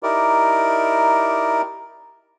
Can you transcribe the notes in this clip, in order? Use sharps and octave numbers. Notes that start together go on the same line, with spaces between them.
D#4 E4 G4 A#4 D5